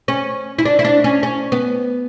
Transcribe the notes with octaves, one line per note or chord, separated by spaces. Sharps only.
C#4
E4
D4
E4
D4
C#4
C#4
B3